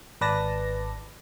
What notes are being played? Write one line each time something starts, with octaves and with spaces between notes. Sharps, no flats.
G#1 B4 D5 A5 A#6